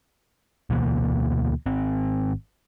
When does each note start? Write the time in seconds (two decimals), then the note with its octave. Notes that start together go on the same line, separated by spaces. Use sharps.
0.70 D2 B2 E3 A#3
1.66 G#1 C4